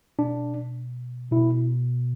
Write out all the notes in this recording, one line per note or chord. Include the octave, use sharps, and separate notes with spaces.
B2 D4
B2 E4